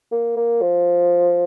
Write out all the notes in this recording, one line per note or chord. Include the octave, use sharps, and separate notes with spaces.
A#3
A#3
F3